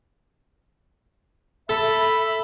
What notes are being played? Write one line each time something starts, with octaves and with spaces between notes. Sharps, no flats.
A4 E5 B5